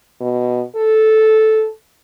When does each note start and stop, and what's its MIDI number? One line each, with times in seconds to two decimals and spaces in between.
0.21 0.62 47
0.76 1.67 69